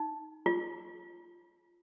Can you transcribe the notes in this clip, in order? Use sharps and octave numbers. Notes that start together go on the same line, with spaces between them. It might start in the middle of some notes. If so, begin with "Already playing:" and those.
Already playing: D#4
F4